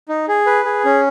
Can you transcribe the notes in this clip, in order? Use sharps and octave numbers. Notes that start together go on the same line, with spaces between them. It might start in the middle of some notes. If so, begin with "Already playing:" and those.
D#4
G#4
B4
G#4
C#4